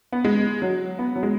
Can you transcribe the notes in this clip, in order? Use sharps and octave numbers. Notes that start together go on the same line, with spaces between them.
B3
G#3
F#3
B3
F#3
G#3